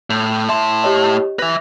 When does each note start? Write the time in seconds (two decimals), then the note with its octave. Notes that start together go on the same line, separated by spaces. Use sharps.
0.10 A2
0.49 A2 E5 A5 C6
0.84 G4 C#5 D#5
1.39 B4 E5 A#6